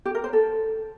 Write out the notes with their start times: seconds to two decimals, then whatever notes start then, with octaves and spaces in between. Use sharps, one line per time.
0.05 G4
0.15 A#4
0.24 C5
0.33 A4